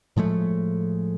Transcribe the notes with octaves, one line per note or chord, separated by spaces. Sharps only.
A2 F3 G#3 A3